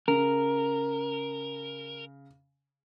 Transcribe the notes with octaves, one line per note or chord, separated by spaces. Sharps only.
C#3 A#4